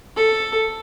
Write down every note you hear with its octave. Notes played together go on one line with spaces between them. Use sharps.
A4